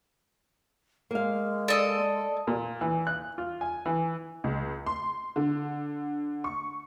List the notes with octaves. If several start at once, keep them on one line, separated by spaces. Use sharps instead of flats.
G#3 A#3 F5
A4 D5 D#5
A#2
E3
F#6
F4
G#5
E3
C#2
C6
D3
C#6